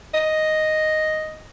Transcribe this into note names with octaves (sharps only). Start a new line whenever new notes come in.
D#5